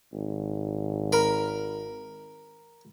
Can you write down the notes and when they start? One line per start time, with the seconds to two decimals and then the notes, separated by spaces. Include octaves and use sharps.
0.13 G#1
1.12 A#4 B5